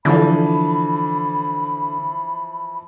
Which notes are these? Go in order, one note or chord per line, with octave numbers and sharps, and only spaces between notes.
D3 E3 F3 B5